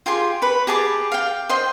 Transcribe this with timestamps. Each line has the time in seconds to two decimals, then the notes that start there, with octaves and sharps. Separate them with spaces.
0.06 F4 G4 G#4 C6
0.42 B4 C#5 B5
0.67 G4 G#4 A5 D6
1.12 F5 G5
1.49 C5 D#5 G5 C6